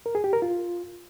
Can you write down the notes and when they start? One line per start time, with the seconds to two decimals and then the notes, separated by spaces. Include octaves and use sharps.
0.06 A#4
0.15 G#4
0.24 G4
0.33 A#4
0.42 F4